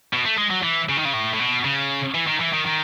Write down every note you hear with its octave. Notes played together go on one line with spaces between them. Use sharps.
B2
A3
G#3
F#3
E3
C#3
D#3
C#3
A2
A2
B2
C#3
E3
D#3
E3
D#3
D#3